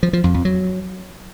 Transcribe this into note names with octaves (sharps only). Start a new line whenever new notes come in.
F3
F3
F2
F2
F#3